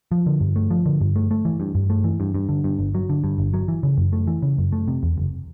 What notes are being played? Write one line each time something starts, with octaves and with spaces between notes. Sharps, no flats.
F3
D3
G2
A3
F3
D3
G2
A3
A3
E3
G2
G2
A3
E3
G2
G2
D3
G2
G1
F#3
D3
G2
G1
F#3
E3
C#3
F#2
A3
E3
C#3
F#2
A3
C3
E2
F#1